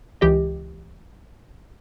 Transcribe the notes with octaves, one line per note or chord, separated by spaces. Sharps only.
C#2 E3 G4 D#5